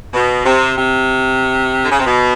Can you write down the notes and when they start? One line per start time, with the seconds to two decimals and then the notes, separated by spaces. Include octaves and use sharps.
0.14 B2
0.45 C3
0.78 C3
1.83 D3
1.91 C#3
1.99 C3
2.06 B2